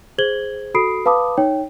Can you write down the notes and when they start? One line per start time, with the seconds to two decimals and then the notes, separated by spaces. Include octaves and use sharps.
0.18 G#4 C5 G#6 F#7 G7
0.74 F#4 A4 B5 D#6 C7 D7
1.06 B4 F5 A5 B5 D6 D#6
1.37 D#4 C#5 G5